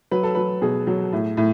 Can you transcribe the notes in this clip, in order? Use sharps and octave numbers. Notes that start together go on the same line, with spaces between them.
F#3 B4
A4
F#3 B4
B2 G#4
F#3
A2
A2